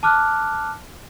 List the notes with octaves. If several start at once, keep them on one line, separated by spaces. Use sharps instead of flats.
A5 D6 F6 F#6